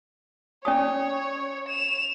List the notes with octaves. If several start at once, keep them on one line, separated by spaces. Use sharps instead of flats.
C#4 C#5 D5 D#6
E7 F7